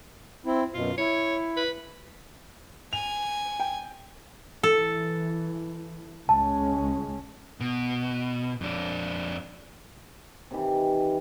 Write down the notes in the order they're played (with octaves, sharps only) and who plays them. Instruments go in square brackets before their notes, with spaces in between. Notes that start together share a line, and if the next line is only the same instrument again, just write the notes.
[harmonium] C4 E4
[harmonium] F#2 B2 [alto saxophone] F4
[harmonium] E4 [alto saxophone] C#5
[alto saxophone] B4
[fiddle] G#5 [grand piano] F7
[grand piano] G5
[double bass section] E3 [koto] A4
[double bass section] C#2 G#3 C#4 [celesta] A5
[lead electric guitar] B2
F2 D4
[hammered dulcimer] C3 D#3 E3